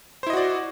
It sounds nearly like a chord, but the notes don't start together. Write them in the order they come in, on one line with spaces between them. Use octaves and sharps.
C5 E4 D#5 F#4 D5